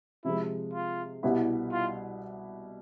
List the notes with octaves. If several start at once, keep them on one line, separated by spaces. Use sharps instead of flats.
C3 F3 G#3 E4
F4
C2 B2 G3 B3 E4
F4